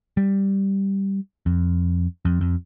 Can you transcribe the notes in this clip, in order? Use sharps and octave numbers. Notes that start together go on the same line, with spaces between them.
G3
F2
F2
F2